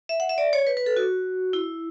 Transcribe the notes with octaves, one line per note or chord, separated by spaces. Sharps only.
E5
F#5
E5
D5
C#5
B4
B4
A4
F#4
E4